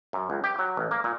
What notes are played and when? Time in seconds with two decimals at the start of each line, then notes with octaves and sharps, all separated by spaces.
0.13 F#2
0.30 C#2
0.44 G4
0.59 F#3
0.77 A1
0.91 A#3
1.04 A#2